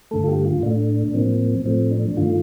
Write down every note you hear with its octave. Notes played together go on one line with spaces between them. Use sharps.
G2 D3 A3 A4
F4
G4
F4
A2 A3 D4
A2 F3 A#3 C4
A2 F3 A3 C4
D4
G2 D#3 A3 F4